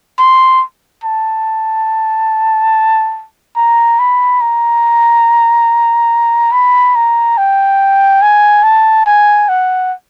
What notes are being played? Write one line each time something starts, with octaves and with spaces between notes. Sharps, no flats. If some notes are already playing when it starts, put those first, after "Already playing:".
C6
A5
A#5
B5
A#5
B5
A#5
G5
G#5
A5
G#5
F#5